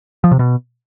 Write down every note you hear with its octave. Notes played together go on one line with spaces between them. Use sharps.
F3
C3
B2